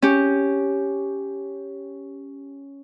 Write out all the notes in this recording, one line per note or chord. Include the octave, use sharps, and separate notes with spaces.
C#4 G4